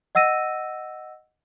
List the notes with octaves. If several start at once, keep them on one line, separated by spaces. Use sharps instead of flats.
D#5 F#5 E6 A#6 D#7